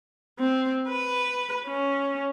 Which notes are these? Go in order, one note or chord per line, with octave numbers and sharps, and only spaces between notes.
C4
B4
C#4